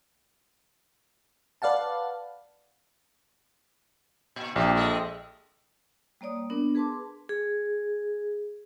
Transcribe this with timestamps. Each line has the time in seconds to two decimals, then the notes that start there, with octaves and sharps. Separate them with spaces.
1.62 B4 D5 F5 F#5 A5
4.36 A#2
4.56 A#1 C4 G4
4.75 G#3 A4 D#5
6.21 G3 A#3 C#5 D5 D#6
6.50 B3 D4 A#4
6.75 G#4 B4 A5 C6 D6
7.29 G#4